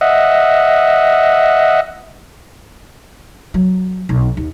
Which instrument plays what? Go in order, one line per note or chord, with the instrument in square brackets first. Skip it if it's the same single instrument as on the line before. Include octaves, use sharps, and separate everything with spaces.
[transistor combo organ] D#5 E5 F#5
[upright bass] F#3
B1
D#2